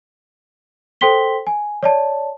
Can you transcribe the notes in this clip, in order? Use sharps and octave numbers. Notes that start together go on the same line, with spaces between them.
A4 C5 G5 C6 B6 G7
G#5
C#5 D5 A5